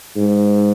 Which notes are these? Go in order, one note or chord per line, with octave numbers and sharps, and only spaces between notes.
G#2